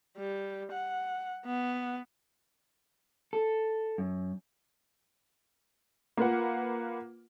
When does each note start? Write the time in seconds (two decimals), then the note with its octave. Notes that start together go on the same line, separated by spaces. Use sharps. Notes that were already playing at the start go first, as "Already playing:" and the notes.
0.17 G3
0.72 F#5
1.45 B3
3.33 A4
3.98 F#2
6.17 A#3 F4 B4 F#5